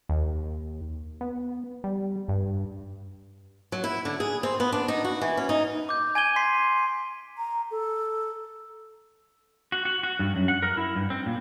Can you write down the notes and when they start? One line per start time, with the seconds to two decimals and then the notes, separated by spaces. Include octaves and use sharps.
0.09 D#2
1.21 B3
1.84 G3
2.28 G2
3.72 F#3
3.84 E4
4.05 D3
4.20 G#4
4.43 C4
4.60 B3
4.72 D4
4.88 D#4
5.04 F#4
5.21 E3
5.37 C#4
5.49 D#4
5.89 D6 G6
6.15 G#5 G#6 D#7 G7
6.36 C6 B6 C7
7.38 A#5
7.71 A4
9.72 F#4
9.85 F#4
10.03 F#4
10.19 G2
10.36 F#2
10.48 F#5
10.63 A#4
10.77 E4
10.96 G2
11.10 C4
11.26 A#2